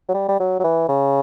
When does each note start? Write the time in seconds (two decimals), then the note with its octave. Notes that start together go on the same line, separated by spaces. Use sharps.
0.09 F#3
0.14 G3
0.28 G3
0.40 F#3
0.60 F#3
0.64 E3
0.89 C#3